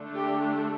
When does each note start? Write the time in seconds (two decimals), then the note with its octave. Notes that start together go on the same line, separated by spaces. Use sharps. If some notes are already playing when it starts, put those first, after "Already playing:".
Already playing: D3 A3 D4
0.15 G4